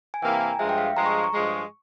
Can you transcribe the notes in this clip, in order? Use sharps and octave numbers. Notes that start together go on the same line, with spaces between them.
G#5
C3 E3 A#3 E4 G5
A#5
G#5
G2 F3 G#3 E5
G5
F5
G2 F3 G#3 A#5
C#6
C#6
G2 F3 G#3